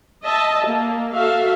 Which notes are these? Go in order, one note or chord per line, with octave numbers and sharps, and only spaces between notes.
D#5 E5 A5
A#3
F#4 A4 E5 F5